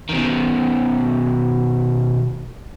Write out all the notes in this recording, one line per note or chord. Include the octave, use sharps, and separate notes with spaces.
B2 D#3